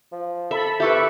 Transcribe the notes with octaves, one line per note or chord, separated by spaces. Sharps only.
F3
A4 E5 B5
E4 G4 A4 B4 E5 C#6